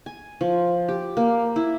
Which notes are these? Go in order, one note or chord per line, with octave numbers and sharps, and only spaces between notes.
G#5
F3
G4
A#3
E4